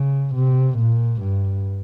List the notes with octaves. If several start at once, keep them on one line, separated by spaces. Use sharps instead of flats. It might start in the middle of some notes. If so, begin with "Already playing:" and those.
Already playing: C#3
C3
A#2
G2